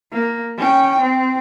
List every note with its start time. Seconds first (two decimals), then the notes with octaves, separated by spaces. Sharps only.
0.12 A#3
0.57 C#4 G5
1.00 C4